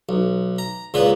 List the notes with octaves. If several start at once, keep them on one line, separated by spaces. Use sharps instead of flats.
B1
A#5
C#2 A#2 B3 B4